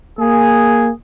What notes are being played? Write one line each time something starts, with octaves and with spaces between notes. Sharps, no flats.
A#3 G#4